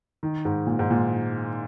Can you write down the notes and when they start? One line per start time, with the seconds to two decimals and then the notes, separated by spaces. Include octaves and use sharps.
0.23 D#3
0.45 G#2
0.67 A#2
0.79 G#2
0.90 A#2